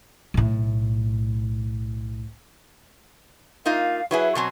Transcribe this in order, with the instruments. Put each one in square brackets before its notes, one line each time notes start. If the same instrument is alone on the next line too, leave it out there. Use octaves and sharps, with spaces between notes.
[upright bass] B1 A2
[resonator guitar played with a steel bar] A#3 D#4 F4 [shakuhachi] F5
[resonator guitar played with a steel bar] F#3 E4 G#4 [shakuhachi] B4
[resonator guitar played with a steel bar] B2 F#3 C4 [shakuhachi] G#5